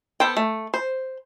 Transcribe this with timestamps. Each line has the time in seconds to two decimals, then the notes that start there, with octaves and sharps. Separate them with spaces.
0.20 B3 A4 C5 G5
0.37 A3
0.74 C5